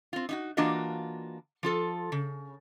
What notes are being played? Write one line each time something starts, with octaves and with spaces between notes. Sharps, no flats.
C4 F4
D#4 E4 F#4
E3 A#3 D4 F4 F#4 D#5
F3 F4 A4
C#3